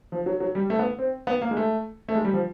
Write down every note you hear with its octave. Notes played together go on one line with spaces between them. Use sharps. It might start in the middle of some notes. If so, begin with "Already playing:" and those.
F3
F#3
F#3
G3
A3
B3
C4
B3
A#3
G#3
A3
A3
G#3
G3
F3